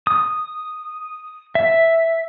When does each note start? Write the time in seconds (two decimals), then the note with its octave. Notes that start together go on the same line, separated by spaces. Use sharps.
0.07 D#6
1.55 E5